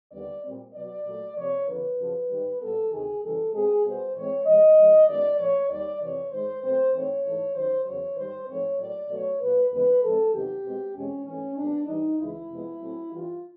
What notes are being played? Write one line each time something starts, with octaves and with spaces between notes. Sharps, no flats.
D#2 D3 G3 B3 D5
A#2 G3 C4
B2 F#3 B3 D5
A#2 F#3 A3
C3 F3 A#3 C#5
F2 D3 F3 A#3 B4
F#2 C#3 F3
G#2 D#3 G3
A#2 G3 B3 A4
D2 C3 D#3 G#4
F#2 C#3 E3 G3 A4
B2 G#3 C4 G#4
B2 G3 B3 C5
A2 E3 G#3 C4 C#5
A2 F3 G#3 D#5
G#2 F3 G#3
F#2 D#3 G#3 B3 D5
A2 F3 A#3 C#5
D#2 D#3 G3 D5
F2 C3 E3 C#5
G#2 D#3 G#3 C5
B2 F#3 A3 C4 C5
G#2 E3 A3 C4 C#5
G#2 E3 A3
F#2 D#3 F#3 C5
E2 C#3 F#3 C#5
G#2 D#3 G3 C5
G#2 F3 A3 C4 C#5
A2 F#3 A#3 D5
B2 F#3 A3 C#5
A#2 F#3 A#3 B4
D#2 C#3 E3 G#3 B3 B4
A2 F3 G#3 C4 A4
F2 C3 D#3 F#3 B3 G4
B2 G#3 C4
E2 B2 G#3 C4 C#4
G#2 E3 A3 C#4
F2 D3 G3 B3 D4
G#2 E3 G3 D#4
D2 C#3 E3 G#3 E4
F2 C3 F3 G#3 B3
A2 F#3 A3 C4
G2 E3 G3 F4